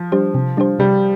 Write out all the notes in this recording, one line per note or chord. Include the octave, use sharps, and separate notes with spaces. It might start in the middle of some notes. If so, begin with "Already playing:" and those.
Already playing: F3
G3 D4 G4 C5
C3
G3 D4 G4 C5
C3 G3